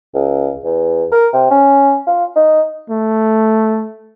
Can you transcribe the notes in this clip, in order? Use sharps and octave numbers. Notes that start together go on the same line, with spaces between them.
C#2
E2
A#4
C3
C#4
F4
D#4
A3